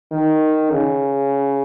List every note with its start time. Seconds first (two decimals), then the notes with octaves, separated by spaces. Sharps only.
0.12 D#3
0.70 C#3